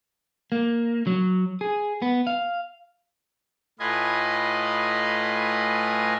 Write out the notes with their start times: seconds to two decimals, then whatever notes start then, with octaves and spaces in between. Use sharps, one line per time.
0.52 A#3
1.07 F#3
1.61 G#4
2.02 B3
2.27 F5
3.79 A2 F4 B4 D#5 G#5